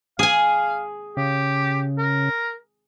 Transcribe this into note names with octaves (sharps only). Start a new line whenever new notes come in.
G#4 F5 G#5
C#3 G4
A#4